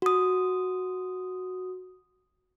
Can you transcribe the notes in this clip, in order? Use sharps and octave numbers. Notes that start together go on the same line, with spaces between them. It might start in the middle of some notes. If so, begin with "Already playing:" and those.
F#4 D#6